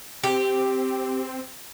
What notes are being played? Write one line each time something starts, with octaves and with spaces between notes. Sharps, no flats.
C4 G4